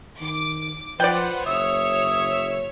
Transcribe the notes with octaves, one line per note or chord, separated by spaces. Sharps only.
D#3 D6
F3 F4 B4 C5 D5 F#5 G5
F#1 C#5 E5 D#6 E6